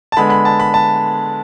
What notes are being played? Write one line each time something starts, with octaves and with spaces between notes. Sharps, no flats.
A5
D3 G#3 B3 B5
B5
A5
B5
A5